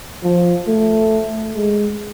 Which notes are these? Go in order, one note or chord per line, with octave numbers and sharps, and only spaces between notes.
F3
A3
G#3